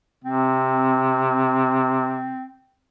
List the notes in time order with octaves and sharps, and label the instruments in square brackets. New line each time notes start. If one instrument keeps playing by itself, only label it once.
[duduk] C3 [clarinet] C4